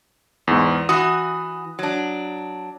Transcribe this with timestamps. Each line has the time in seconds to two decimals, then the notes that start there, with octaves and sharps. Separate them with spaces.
0.47 E2 G#2
0.89 E3 F#4 D#6
1.79 F#3 D4